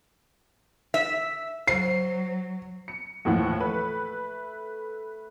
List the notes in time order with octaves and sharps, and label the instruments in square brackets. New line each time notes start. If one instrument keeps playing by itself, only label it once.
[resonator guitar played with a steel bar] E5
[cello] F#3 [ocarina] C5 [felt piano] C7
[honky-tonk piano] C#7
D#2 A2 E3 F3 F#5
A3 B4